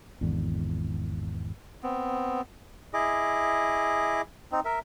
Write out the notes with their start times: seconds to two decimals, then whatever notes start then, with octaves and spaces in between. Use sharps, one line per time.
0.21 G#1 E2 D3
1.83 B3 C4
2.94 E4 G#4 D#5 D6
4.52 C4 D#4
4.65 A#4 E5